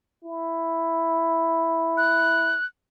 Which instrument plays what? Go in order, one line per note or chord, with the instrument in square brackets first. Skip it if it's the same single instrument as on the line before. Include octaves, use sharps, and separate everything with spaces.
[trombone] E4
[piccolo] F#6